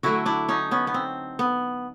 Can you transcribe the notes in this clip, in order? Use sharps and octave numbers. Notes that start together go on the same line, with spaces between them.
D3 F#3 A3 E4 F#4
D4 E4
C#4 D#4
B3 C#4
B3
C4
B3